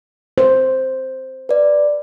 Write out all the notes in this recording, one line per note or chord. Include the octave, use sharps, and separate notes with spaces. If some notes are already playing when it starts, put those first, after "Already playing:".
C5
B4 D5